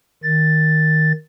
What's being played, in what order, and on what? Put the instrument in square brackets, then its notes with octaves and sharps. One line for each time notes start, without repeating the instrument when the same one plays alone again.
[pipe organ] D#3 A6